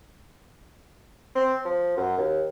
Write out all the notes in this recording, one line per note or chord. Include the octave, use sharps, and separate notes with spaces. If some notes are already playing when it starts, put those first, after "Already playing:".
C4
F3
F#2
D#2